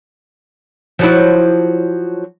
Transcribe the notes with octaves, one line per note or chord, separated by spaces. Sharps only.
F3 F#3 E4